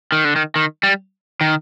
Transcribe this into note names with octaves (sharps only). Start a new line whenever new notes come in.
D#3
D3
D#3
D#3
G3
D#3